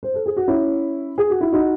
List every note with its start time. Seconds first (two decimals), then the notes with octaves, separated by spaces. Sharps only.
0.03 C5
0.14 A4
0.26 G#4
0.37 F#4
0.48 C#4 E4
1.18 G#4
1.30 F#4
1.41 E4
1.52 D#4 F#4